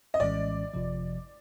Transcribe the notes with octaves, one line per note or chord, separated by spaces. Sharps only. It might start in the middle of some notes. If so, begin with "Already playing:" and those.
D#5
A#1 A2 E3 G#3 C#4 D5
G1 F2 C3 F3